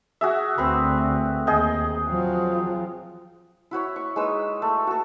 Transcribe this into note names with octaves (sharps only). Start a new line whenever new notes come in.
F#4 G#4 E5
D2 C4 B4
D#2 G#4 D#5 G5
F3 F#3
E4 F#4 C#5 B5
C#6
G#3 D#4 B4 E6
A3
F#4 A4